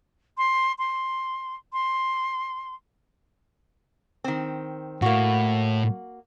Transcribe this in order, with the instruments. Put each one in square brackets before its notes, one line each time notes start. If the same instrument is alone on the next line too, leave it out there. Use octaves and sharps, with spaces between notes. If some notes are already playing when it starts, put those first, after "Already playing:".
[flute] C6
C6
C6
[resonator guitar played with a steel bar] D#3 C4
[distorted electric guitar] A2 [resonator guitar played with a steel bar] A#3 F#4